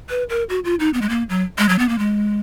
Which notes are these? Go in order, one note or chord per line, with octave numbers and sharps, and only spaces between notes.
B4
A#4
F#4
F4
D#4
B3
G#3
A#3
F#3
G#3
F#3
B3
A#3
G#3